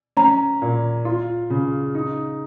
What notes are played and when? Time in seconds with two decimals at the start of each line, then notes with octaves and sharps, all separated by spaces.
0.17 C#4 A#5
0.62 A#2
1.05 F4
1.50 C#3
1.95 D#4